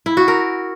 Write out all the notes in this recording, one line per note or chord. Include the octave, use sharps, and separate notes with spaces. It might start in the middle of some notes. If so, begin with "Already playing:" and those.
E4
F#4
A#4